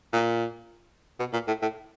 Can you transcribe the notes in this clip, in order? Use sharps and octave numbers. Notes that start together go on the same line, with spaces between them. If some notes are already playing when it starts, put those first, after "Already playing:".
A#2
B2
A#2
A2
A2